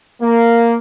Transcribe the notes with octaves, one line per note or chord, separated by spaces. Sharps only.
A#3